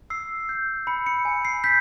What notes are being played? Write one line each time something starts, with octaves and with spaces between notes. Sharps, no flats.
E6 C7
G6
B5 C#7
C#7
G#5
C7
G6 B6